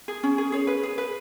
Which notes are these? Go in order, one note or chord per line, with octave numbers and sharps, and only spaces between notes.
G#4
C#4
G#4
G#4 C#5
B4
G#4
B4